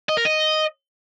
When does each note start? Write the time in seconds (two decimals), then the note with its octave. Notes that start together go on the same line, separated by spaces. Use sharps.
0.09 D#5
0.17 A#4
0.25 D#5